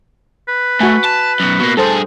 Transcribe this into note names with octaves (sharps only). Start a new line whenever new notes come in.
B4
A3 F#4 G#5
A5
F#2 B2
B2 A#3
G2 G#4 A4 C5 A5